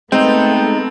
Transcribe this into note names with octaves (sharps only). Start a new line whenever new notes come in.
G#3 A3 B3 C4 D#4 A4 G5